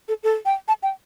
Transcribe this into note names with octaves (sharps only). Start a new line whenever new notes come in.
A4
A4
G5
A5
G5